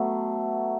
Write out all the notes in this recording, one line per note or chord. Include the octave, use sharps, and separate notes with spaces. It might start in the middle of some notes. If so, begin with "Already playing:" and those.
Already playing: F#3 A3 B3